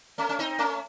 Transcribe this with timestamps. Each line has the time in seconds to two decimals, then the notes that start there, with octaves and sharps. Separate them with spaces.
0.18 A3 C#4
0.29 C#4
0.39 C4 D#4
0.58 A3 C#4